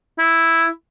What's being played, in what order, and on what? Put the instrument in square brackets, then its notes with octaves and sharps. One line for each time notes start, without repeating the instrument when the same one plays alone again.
[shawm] E4